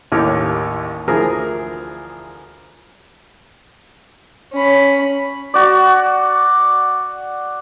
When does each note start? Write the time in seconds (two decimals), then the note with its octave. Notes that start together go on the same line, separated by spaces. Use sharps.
0.12 A1 D#2 D#3 G4 C#5 F6
1.08 D2 E3 F3 G#4 A#4 A#5
4.53 C#4 B5
5.54 F#4 D5